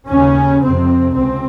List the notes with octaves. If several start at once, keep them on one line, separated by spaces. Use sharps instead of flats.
D#2 C#3 C#4
F2 C3 C4
C#2 C4